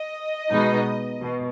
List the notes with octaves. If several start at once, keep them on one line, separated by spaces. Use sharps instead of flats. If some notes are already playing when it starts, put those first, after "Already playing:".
Already playing: D#5
B2 G#3 B3 D#4
B2